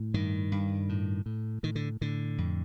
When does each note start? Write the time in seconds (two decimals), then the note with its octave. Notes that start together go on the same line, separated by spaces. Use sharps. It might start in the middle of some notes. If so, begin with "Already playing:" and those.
Already playing: A2
0.14 G2 D#3
0.52 G2
0.89 A2
1.26 A2
1.63 A2 D#3
1.75 D3
2.01 A2 D3
2.38 F2